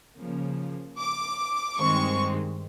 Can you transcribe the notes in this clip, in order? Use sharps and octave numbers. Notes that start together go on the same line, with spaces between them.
C#3 F3 A#3
D6
G2 D#3 G#3 C4 C#6